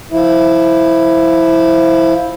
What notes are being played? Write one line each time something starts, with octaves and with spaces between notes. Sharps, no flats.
F3 E4